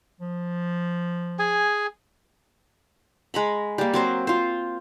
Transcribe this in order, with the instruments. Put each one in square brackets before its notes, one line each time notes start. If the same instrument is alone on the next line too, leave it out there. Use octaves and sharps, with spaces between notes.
[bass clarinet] F3
[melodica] G#4 G#5
[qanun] G#3 A#5 B5
G3 A#3
F#3 C4 C5
F4 C5